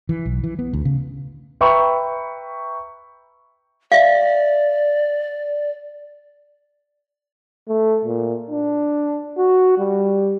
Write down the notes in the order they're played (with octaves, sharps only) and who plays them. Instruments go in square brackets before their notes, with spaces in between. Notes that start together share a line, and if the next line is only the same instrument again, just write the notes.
[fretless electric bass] E3
B1
E3
B3
D2
C#3
[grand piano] B4 E5 G5 A#5 B5 C#6
[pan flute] D5 [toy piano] E5 F5
[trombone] A3
A#2
D4
F#4
G3